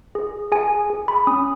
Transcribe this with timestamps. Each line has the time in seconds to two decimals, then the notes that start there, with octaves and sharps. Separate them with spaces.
0.15 G#4
0.52 G#4 G#5
0.90 G#4
1.08 B5
1.27 C#4 D#6